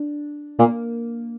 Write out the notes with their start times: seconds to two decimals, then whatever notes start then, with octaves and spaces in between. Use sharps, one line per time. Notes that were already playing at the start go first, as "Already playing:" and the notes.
Already playing: D4
0.59 A#2 A#3